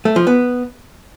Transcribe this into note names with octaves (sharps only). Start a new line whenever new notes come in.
A3
F3
B3